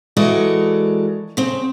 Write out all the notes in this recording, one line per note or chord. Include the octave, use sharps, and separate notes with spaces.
E3 G#3 F#4 A4 A#4 D5
C#3 C4